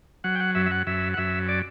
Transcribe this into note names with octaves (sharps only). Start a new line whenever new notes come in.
F#3 F#5
G5
F#5
F#2 E5
E5
F#5
F#2 E5
F#5
F#2 E5
D5